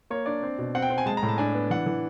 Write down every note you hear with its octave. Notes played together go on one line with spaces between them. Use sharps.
A#3 C#5
D4 D5
C4
B2
C4 F#5
G5
C4
G#5
G#3 A5
A#5
A2
A5
D4 G#5
B3
E3 F#5
E3